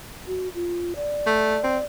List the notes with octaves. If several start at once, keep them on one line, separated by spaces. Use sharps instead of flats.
F#4
F4
D5
A3
C4